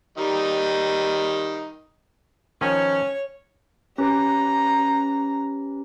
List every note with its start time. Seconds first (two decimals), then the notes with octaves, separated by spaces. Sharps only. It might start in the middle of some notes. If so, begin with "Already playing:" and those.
0.18 D#3 G3 D#4
2.61 D#3 F3 C#4 C#5
3.98 C#4 G4 B4 A#5